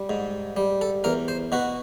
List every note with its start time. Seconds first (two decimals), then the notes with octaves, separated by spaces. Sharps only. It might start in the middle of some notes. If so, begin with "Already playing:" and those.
Already playing: G3
0.10 G#2
0.57 G3
0.81 A4
1.04 E2 A#4
1.28 C5
1.52 B2 F#4